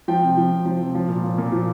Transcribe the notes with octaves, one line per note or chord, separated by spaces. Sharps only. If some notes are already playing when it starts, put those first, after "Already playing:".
F3 G5
C3
F3
C3
F3
C3
F3
A#2
F3
A#2
F3